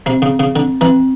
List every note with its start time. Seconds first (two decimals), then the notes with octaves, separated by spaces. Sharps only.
0.06 C3 C4
0.22 C#3
0.31 C4
0.40 C#3
0.56 D3 C4
0.81 E3 C4